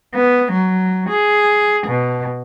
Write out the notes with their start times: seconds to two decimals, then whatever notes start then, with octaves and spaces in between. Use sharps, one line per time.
0.14 B3
0.52 F#3
1.09 G#4
1.87 B2